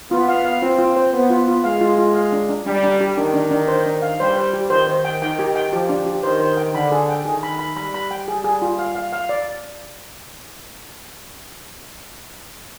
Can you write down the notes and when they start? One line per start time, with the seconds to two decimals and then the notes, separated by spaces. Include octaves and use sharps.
0.11 B3 F4
0.28 F5
0.45 F5
0.62 C4 F4
0.79 F4
0.96 C5
1.13 B3 C5
1.30 F4
1.48 F4
1.64 G#3 F5
1.81 F4
1.98 F4
2.15 F5
2.32 D4
2.49 D4
2.66 G3 D4
2.83 D4
3.01 G4
3.17 D#3 D4
3.34 D4
3.51 D4
3.68 C5
3.86 D4
4.02 F5
4.20 G3 C5
4.37 C5
4.53 G4
4.70 D#3 C5
4.87 C5
5.05 G5
5.22 D#3 G5
5.39 G4
5.56 G5
5.73 F3 G4
5.89 D4
6.06 G4
6.23 D#3 C5
6.40 C5
6.57 G5
6.74 D3 B5
6.92 G#4
7.09 G5
7.25 D#3 G#4
7.43 B5
7.59 B5
7.77 G3 B5
7.94 B5
8.11 G5
8.28 G#4
8.44 G#4
8.62 F4
8.79 F5
8.95 F5
9.13 F5
9.29 D5